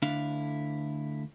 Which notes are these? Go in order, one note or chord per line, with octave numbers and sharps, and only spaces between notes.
D2 D3 D4 E4 F5